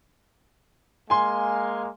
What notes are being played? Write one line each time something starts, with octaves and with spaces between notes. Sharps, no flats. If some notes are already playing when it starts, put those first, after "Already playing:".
G#3 A#3 F5 G#5 C6